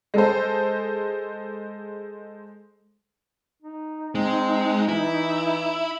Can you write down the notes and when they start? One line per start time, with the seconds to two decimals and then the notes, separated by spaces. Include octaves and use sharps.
0.14 G#3 A4 C5
3.62 D#4
4.15 G#3 C4
4.88 E3 E4